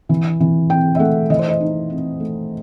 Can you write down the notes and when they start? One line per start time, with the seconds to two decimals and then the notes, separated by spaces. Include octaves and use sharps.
0.09 E3
0.40 E3
0.70 C4 G5
0.95 E5
0.99 A3 F#5
1.30 E3 D#5
1.39 C5
1.48 D#5
1.60 D#4
1.90 C4
2.20 A3